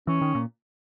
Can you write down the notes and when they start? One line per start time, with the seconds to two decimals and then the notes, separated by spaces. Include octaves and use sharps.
0.07 E3 C#4
0.21 D#3
0.35 A#2